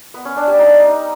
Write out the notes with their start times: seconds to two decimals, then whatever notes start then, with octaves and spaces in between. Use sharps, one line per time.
0.14 B3
0.25 C#4
0.36 D4
0.47 G3
0.58 D#4